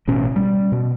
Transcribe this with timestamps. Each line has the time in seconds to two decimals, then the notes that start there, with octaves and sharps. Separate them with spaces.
0.08 A1 B2 C#4
0.36 G3
0.72 B2